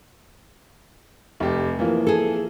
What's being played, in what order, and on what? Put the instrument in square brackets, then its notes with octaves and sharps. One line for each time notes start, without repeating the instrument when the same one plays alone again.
[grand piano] F1 G4
E3 F3 A#3
[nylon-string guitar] G#4 A4